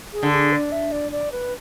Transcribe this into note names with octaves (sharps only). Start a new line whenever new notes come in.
G#4
D3
G#4
D5
E5
D5
D5
B4